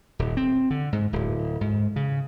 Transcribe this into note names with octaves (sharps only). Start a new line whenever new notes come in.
D#1
C4
D3
G#2
D1
G#2
C#3